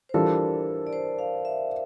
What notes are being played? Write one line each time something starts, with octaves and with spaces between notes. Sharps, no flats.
C5
E3 G3 D4 F4 A4 A#4
D5
C5
F5
E5